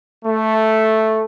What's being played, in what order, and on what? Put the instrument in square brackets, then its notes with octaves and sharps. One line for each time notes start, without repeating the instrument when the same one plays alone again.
[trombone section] A3